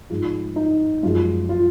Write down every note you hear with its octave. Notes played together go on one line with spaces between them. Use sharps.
G#2 F3 G#3 F4
D#4
F#2 F3 G#3 F4
F4